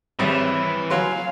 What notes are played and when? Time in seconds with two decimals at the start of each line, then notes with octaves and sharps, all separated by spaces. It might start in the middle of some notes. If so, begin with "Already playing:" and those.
0.19 G#1 E3 G3 C4 C#5
0.90 F#3 F5 G#5 C6